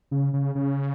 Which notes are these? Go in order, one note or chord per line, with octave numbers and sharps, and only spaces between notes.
C#3
C#3
C#3